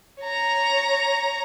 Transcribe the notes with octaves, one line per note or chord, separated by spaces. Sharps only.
C#5 A#5